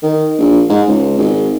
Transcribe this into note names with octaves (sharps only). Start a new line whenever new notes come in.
D#3
A#1
G#2
C#2
G#1